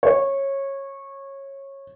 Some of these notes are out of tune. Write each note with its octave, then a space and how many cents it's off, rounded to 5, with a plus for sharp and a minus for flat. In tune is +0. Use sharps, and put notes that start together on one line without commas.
C#5 -20